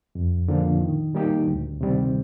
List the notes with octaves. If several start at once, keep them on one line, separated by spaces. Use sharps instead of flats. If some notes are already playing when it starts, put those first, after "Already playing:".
F2
D3 F3 A#3 F4
D#3
G3 A#3 D#4 G4
D2
C3 D#3 G3 C4